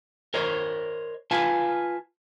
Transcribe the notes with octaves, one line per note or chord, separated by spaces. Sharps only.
A#4 C5 C#5 D#5
F4 B4 F5 G#5 A5